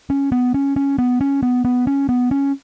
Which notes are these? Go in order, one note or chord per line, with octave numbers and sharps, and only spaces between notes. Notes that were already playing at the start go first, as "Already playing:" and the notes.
C#4
B3
C#4
C#4
B3
C#4
B3
B3
C#4
B3
C#4